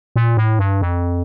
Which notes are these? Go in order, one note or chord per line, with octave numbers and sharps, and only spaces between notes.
A#2
A2
G2
F2